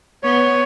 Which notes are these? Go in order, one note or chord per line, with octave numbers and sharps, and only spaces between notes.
B3 C#5